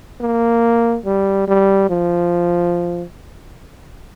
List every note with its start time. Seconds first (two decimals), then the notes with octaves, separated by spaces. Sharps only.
0.21 A#3
1.05 G3
1.48 G3
1.90 F3